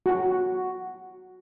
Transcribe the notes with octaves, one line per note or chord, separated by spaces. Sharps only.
F#4